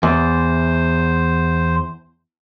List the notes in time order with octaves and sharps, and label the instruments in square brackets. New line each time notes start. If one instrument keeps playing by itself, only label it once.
[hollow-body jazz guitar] E2 [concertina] C5